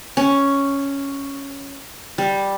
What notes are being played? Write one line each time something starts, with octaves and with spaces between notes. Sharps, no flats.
C#4
G3